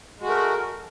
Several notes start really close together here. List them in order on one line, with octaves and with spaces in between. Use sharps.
G#3 F#4 A3 A#4